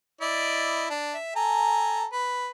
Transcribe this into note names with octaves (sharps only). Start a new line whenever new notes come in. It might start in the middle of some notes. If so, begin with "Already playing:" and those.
E4 D5 D#5
D4
E5
A4 G#5 A#5
B4